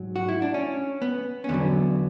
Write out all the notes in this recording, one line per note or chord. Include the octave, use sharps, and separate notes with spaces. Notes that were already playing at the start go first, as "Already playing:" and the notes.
Already playing: G#2 F#3
F#4
E4
D4
C#4
B3
C#4
E2 D3 F#3 B3